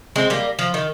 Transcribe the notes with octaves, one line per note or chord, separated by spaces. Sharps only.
G#3 C4
G3 A#3
F3
D#3